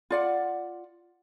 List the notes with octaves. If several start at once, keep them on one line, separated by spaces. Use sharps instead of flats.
F4 D5 F#5